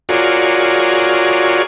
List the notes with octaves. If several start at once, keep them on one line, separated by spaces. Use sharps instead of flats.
F4 F#4 G#4 A#4 C#5 D5